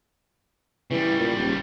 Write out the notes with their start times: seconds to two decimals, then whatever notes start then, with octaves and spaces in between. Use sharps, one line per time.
0.91 C#3 E3 G3
1.20 A#2
1.37 D#1